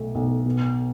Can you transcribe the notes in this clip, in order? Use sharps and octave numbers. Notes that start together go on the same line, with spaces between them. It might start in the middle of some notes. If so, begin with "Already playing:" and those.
Already playing: B1 A3
B1
B2